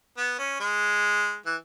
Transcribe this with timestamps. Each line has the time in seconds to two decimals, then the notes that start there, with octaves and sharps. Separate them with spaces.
0.17 B3
0.39 C#4
0.60 G#3
1.46 E3